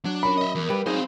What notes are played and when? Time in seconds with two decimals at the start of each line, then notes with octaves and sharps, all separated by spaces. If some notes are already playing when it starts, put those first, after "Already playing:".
0.05 F#3 D4
0.23 C#4 A#4 C#5 B5
0.38 D#5 E5
0.55 E2 A#4
0.70 G3 G4 B4
0.86 F#3 B3 C4 D#4 G#4 C5 F5